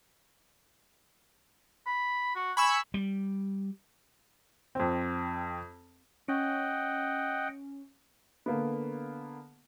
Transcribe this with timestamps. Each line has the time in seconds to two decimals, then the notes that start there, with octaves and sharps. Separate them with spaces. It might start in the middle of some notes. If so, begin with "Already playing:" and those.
1.86 B5
2.36 F#4
2.57 G#5 B5 C#6 E6
2.94 G3
4.75 F2 C4
6.28 C#4 D#5 F#5 G5
8.46 D3 A#3 B3